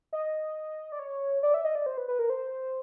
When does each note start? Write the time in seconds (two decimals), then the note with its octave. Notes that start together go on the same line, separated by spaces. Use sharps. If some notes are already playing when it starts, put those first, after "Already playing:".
0.13 D#5
0.92 D5
0.99 C#5
1.43 D5
1.54 E5
1.65 D#5
1.75 D5
1.86 C5
1.98 B4
2.08 B4
2.19 A#4
2.30 C5